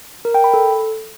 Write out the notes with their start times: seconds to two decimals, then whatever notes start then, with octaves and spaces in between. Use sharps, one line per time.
0.25 A#4
0.34 G5
0.44 B5
0.54 A4